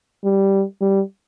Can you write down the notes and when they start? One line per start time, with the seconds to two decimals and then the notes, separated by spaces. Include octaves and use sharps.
0.24 G3
0.81 G3